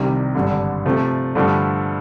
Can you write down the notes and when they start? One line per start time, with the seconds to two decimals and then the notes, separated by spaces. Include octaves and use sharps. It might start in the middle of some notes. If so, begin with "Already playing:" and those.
Already playing: C2 C3 D#3 G3
0.35 G#1 G2 D3
0.85 C3 F3 A3
1.35 G2 D3 F3 A3